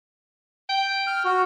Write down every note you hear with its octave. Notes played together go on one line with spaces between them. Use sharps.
G5
F6
F#4